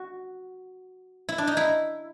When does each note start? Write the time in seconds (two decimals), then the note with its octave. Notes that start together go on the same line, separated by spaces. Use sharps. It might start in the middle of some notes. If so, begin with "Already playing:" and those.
Already playing: F#4
1.29 E4
1.38 D4
1.47 D#4
1.57 E4